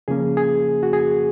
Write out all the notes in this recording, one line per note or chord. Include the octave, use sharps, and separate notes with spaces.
C#3 F3 A#3 C#4 G#4
G#4
F#4
G#4